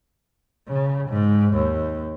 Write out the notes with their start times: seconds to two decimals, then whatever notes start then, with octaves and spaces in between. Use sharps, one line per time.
0.68 C#3
1.10 G#2
1.55 D#2